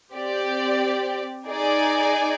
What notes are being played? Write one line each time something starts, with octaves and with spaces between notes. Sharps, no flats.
C4 G4 D5
D#4 G#4 D5 G#5